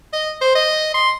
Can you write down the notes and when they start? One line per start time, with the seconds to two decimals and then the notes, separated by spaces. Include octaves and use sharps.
0.14 D#5
0.41 C5
0.55 D#5
0.94 C6